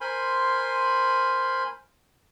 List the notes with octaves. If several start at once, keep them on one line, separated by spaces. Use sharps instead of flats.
A#4 C5 G#5 B5 C6